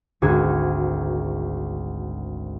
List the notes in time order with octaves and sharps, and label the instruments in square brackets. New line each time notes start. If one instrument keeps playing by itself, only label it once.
[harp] G#1 D2 F#4 G#4 G#5 G#6